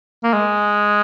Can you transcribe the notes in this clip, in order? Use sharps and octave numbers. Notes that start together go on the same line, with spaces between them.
A#3
G#3